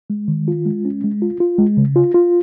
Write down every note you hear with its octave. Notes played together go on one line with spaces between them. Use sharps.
G#3
D#3
F4
G#3
C#4
G#3
F4
F4
G#3
C#3
F4
F4